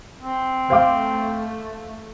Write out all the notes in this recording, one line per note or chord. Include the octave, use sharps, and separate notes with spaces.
C4
A3 C5 F5 D6